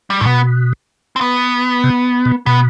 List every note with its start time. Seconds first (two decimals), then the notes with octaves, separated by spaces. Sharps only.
0.10 G3
0.21 A2 A3
0.25 B2 B3
1.16 C4
1.21 B3
1.84 C3
2.25 B2
2.46 B2 B3